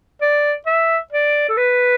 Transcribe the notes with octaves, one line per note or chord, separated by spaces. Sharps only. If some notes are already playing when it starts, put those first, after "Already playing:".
D5
E5
D5
A4
B4